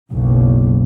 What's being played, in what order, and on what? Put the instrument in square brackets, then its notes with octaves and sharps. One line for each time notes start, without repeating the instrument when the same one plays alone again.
[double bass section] F#1 B1